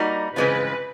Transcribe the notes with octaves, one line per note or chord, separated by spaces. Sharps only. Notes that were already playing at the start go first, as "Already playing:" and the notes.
Already playing: G3 A#3 D#4 F#4
C#3 E3 G#3 C4 F4 B4